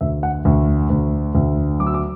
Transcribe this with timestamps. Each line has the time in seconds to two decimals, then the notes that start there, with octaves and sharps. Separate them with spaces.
0.01 D2 E5
0.23 F#5
0.45 D2
0.90 D2
1.35 D2
1.79 F#3 D6
1.87 E6
1.94 D6